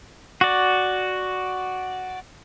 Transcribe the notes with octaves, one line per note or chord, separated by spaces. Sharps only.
F#4 D5